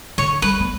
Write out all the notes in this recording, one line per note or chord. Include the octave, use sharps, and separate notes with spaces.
D3 C#5
G3 B4
B3